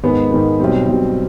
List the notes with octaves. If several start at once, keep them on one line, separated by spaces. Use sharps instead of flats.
G#2 D#3 G#3 B3
G#2 D#3 G#3 B3
B1 B2 G3 C4
B1 B2 G3 C4